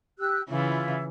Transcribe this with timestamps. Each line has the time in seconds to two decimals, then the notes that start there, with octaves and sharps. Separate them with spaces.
0.19 G4 E6 F#6
0.50 C#3 E3 E4 F4 E5